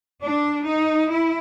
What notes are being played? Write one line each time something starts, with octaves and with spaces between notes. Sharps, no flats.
D4
D#4
E4